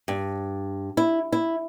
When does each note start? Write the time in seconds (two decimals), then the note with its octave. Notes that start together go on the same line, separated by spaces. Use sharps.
0.08 G2
0.97 E4
1.32 E4